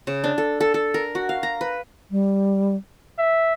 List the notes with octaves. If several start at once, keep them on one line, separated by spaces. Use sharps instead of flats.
C#3
D4
A4
A4
A4
A#4
F#4
F5
A#5
B4
G3
E5